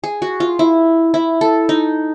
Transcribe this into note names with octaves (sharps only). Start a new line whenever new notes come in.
G#4
F#4
F4
E4
E4
A4
D#4